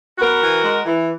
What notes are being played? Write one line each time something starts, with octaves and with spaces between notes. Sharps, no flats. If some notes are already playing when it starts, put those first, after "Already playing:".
B3 F#4 A#4
E3
G#3
E3